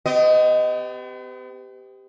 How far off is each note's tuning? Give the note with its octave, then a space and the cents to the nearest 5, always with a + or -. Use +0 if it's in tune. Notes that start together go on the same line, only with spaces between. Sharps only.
B3 +45 G4 +0 D#5 +0